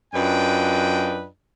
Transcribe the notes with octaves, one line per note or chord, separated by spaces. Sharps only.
F#2 D4 F4 B4 D#5 G5